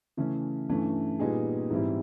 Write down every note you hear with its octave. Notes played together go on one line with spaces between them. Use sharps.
C#3 E3 A3 C#4
G2 E3 A3 C#4
A#2 G3 B3 D#4 G#4
G#2 E3 G3 C4 E4